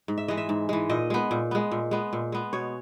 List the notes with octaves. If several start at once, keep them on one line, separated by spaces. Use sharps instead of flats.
G#2
E5
E3 G#3 D#5
E5
G#2
E3 G#3
A#2 D#5
G#3 B3
A#2
G#3 B3
A#2
G#3 B3
A#2
G#3 B3
B2 C#5